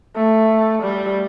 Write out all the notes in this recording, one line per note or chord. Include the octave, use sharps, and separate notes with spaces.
A3
G3